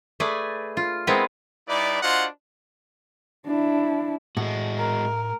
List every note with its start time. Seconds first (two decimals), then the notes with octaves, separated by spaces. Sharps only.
0.20 A3 G#4 B4 D5
0.77 F4
1.07 G#3 B3 C4 E4 A#4 B4
1.68 G3 D#4 E4 B4 D5
2.02 D4 F4 F#4 C5 D#5 F#5
3.46 D4 E4
4.37 A2 G#3 F#4
4.78 A#4